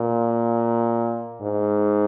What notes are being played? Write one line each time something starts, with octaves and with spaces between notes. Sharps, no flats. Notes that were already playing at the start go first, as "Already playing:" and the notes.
Already playing: A#2
G#2